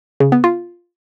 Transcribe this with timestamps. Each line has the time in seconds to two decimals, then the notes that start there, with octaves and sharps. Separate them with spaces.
0.20 C#3
0.32 B3
0.44 F4